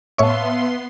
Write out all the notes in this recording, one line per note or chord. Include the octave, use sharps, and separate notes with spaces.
A2 B3 C#5 E5 F5 A5 C6 C#6